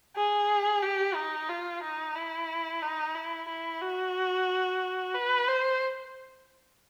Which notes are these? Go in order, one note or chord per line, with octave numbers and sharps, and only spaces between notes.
G#4
G4
D#4
F4
D#4
E4
D#4
E4
E4
F#4
B4
C5